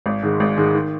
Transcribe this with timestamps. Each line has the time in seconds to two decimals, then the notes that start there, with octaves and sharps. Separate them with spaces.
0.06 G#1
0.23 G#2 D#3 G#3
0.40 G#1
0.57 G#2 D#3 G#3
0.74 D#3